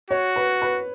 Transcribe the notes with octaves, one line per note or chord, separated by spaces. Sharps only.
F#4 C#5
B4
B4